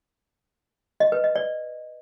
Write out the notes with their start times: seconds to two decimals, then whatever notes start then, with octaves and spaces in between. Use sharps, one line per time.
1.00 D#5
1.12 B4
1.24 D#5
1.36 D5